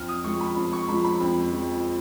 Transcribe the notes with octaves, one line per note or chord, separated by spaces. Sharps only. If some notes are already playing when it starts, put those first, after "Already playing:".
Already playing: F2 F6
D#6
F3 G#3 C#6
B5
F2 B5
C#6
F3 G#3 B5
B5
F2
F3 G#3